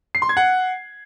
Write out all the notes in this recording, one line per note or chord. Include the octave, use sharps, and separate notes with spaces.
C7
C6
G#6
F#5